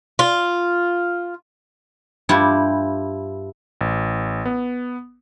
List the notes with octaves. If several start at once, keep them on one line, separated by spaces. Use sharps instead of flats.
F4
G2 E4 F4 G4
A1
B3